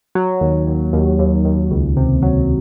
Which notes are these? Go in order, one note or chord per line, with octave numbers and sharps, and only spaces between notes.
F#3
D#2
D#2
D#2
D#2
D#2
C#2
C3
F#3